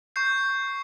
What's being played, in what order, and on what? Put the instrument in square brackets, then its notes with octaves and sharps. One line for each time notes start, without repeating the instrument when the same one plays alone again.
[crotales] C#6 G6 C7